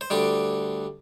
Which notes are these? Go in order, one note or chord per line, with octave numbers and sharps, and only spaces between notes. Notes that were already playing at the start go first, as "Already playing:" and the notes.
C5
D2 D3 G3 D5